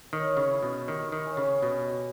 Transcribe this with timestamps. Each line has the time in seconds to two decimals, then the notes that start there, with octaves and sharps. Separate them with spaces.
0.12 D#3 C#5
0.37 C#3
0.51 E4
0.63 B2
0.88 D#3 G4
1.12 D#3
1.25 C#4
1.37 C#3
1.62 B2 D#5